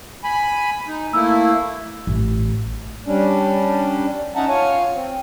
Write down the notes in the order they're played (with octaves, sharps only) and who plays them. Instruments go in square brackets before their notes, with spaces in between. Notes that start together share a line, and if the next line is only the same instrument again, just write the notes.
[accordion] G#5 B5
D#4
[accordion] A3 A#3 E4 [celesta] E6
[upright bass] A1
[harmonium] G3 C#4 D4
C#4 D#4 E5 F#5 A5 A#5
F4 C#5 G#5
C4